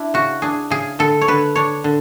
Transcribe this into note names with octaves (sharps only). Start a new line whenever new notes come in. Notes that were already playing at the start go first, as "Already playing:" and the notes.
Already playing: D4 E4
C#3 F#4
D4 G#4
C#3 G#4
D3 A4
C#5
D3 B4
D4 C#5
D3